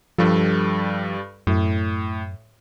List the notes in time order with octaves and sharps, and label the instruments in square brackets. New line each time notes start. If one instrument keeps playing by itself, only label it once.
[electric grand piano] G2 G3 A4 [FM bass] F3
[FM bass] F#2 [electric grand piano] A2